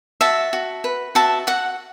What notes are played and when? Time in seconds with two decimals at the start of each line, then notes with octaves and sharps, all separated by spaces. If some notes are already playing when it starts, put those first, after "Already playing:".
0.21 F#4 E5 A5
0.53 F#4
0.84 B4
1.15 F#4 E5 A5
1.47 F#4 F#5